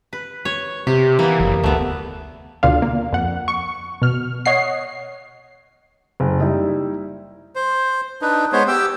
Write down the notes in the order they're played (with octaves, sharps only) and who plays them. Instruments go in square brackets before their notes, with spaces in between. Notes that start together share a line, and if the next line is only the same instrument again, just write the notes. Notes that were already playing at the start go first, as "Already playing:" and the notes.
[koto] B4
C#5
[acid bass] C3 [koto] G4
[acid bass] E3 [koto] A#3 B3
[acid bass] F#1
[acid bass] D2 [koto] A3 B3
[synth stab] D2 B2 D3 D4 F4 F5
A#3
F2 F#5
C#6
B2 F6
C#5 D#5 F#5 C7
[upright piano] F#1
G3 D#4 E4
[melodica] C5
D4 D#4 B4
G#3 B3 C5 C#5
G4 G5 D6 E6